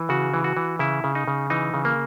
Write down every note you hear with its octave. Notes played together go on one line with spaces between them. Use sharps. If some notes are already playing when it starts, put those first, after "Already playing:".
Already playing: E3
C#3 F#4
E3
F#4
E3
C#3 E4
C#3
D#4
C#3
E3 D#4
C#3
A#3